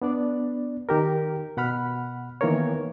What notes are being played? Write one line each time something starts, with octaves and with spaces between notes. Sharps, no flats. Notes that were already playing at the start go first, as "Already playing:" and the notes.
B3 D4 D5
D#3 G4 A#4
B2 F#5 B5 F6
D#3 E3 A#3 B3 A#4 C#5